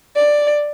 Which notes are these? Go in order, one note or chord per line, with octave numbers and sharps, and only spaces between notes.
D5